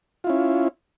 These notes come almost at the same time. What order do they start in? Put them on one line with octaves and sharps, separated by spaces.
F4 E4 C#4